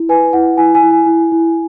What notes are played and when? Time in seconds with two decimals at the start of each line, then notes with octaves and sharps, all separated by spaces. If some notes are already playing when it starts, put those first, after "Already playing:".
Already playing: E4
0.09 B4 G#5
0.33 E4 F#5
0.57 E4 G#5
0.75 G#5
0.82 E4
0.91 G#5
1.07 E4
1.32 E4